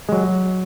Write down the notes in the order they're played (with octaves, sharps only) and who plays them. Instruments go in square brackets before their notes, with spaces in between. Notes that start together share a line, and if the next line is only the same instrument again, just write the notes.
[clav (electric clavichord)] F#3 G#3